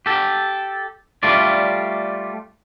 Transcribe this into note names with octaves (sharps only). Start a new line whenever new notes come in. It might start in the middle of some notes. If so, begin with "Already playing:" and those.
G4 A4
G3 A3 F4 D5